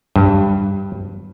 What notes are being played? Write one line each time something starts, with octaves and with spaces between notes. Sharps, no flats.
G2